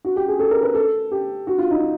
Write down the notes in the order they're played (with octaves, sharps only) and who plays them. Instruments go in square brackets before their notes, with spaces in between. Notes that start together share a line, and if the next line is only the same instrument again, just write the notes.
[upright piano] F#4
G4
G#4
A4
A#4
B4
A4
G4
F#4
F4
D#4